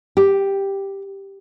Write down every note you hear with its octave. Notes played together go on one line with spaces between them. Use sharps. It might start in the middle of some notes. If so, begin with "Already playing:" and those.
G4